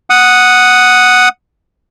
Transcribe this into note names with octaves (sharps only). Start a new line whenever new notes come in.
F#5 D#6